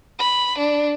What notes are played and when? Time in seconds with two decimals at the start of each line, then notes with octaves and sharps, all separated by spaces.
0.19 B5
0.58 D4